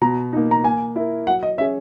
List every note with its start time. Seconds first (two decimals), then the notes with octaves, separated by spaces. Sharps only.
0.01 B2 A#5
0.33 A#3 D#4
0.51 A#5
0.64 A#3 G#5
0.96 E4 A#4
1.27 F#3 F#5
1.43 D#5
1.58 C#4 G#4 E5